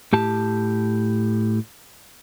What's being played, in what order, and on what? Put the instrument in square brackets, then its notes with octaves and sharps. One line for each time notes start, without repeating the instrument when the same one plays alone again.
[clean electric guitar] A2 G4 A5